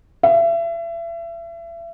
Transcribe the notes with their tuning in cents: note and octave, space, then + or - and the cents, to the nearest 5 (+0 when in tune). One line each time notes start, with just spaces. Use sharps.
E5 +35